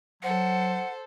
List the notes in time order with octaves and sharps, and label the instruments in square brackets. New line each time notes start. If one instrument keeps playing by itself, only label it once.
[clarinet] F#3 [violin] A4 C5 [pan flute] F#5